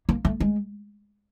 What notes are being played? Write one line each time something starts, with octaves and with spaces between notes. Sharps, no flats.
A#3
A3
G#3